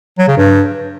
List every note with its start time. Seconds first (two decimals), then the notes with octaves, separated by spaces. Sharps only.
0.19 F#3
0.28 C#3
0.37 G2